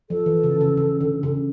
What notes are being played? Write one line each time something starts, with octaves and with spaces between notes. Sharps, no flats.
F3 A4
E3
C#3
C#3
C#3
D3
C#3